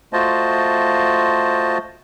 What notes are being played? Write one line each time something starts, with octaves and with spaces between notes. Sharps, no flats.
A3 F4 F#4 C5 D#5 A5